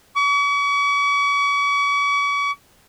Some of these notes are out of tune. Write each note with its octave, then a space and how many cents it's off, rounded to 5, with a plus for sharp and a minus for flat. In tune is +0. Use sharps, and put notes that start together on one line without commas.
C#6 +45